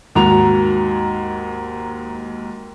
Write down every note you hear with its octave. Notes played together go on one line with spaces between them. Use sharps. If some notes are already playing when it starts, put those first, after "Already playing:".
D#2 G#2 F#4 A#5 F7